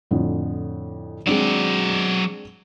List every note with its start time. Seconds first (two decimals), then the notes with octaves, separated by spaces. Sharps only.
0.11 F2 A2 D3
1.27 F#3 G#3 C4 D4 D5